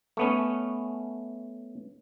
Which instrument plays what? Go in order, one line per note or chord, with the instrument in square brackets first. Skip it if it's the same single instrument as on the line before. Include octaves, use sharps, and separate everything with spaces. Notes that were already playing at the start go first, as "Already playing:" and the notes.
[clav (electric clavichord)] A3 B3 C#4